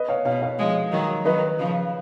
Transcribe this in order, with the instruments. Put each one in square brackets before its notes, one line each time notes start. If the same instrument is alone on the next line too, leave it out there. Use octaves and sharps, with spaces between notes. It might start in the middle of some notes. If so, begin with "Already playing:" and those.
Already playing: [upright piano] B4 D#5
C#5 F5
[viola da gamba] B2 [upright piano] C#5 F5
[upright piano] C#5 F5
[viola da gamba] F3 G#3
D#3 F#3
[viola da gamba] D#3 F#3 [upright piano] B4 D#5
[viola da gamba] C#3 F3